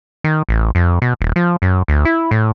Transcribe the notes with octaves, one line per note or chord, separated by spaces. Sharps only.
D#3
A1
F2
B2
D#1
F3
F#2
D2
E4
A2